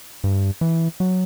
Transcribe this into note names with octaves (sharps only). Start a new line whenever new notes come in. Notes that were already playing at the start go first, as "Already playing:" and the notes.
G2
E3
F#3